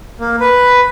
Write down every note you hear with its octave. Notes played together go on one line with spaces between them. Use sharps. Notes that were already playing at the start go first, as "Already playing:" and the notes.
A#3
B4